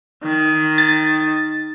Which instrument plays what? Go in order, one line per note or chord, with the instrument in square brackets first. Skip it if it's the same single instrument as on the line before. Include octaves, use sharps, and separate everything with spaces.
[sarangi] D#3
[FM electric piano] A6